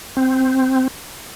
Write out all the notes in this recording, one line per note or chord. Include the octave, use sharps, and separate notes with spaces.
C4